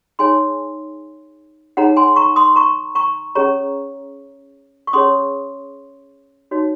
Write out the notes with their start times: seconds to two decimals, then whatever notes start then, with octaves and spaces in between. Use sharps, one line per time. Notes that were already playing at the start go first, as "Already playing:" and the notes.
0.19 D#4 G#4 C#5 G#5 C6
1.77 D#4 G#4 C#5 F#5 A#5
1.97 G#5 C6
2.16 A#5 C#6
2.36 C6 D#6
2.56 A#5 C#6
2.95 A#5 C#6
3.35 C#4 G#4 C#5 A#5 C#6
4.87 C#6
4.93 C#4 G#4 C#5 C6 D#6
6.51 D#4 F#4 C#5